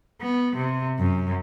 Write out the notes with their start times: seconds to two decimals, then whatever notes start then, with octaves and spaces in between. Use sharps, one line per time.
0.21 B3
0.56 C3
0.99 F#2